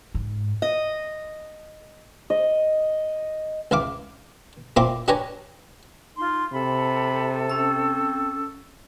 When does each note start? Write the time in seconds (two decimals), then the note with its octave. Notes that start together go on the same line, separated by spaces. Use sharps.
0.15 G#2
0.62 D#5
2.30 D#5
3.71 C#2 E4 F5 D6
4.76 A#2 C4 E4 A#4 F5 D6
5.08 D4 G4 B4 C#5 G#5 A#5
6.17 D#4 F4 C6
6.53 C3 A4 B5
7.49 C4 C#4 E6